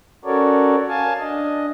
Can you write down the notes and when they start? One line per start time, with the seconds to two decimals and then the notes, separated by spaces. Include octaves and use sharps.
0.25 C#4 F#4 A4 A#4 C#5 D5
0.88 F5 G#5 A5
1.19 D4 D#5